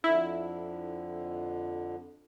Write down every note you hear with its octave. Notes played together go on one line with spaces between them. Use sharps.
F2 D3 E4